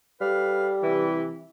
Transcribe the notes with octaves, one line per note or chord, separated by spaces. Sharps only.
G3 A4 B4 F5
C3 E3